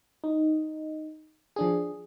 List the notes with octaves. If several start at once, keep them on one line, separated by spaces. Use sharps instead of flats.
D#4
F3 D4 G#4